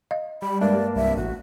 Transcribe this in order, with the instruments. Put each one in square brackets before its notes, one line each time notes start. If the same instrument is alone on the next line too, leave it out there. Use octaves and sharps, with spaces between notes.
[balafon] D#5 F5
[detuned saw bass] G3 [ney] B5
[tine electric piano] G2 A#3 D4 [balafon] G#3 [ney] D5
[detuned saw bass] C2 [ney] E5
[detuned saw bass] A1 [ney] F#4